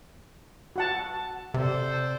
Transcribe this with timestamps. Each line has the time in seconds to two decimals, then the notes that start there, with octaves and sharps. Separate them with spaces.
0.76 F#4 F#5 A5
1.54 C3 A4 C5 D5